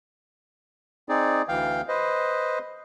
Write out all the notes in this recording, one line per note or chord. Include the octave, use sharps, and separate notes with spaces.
C4 D#4 G#4 D5
D2 E3 F5 G5
B4 C5 D#5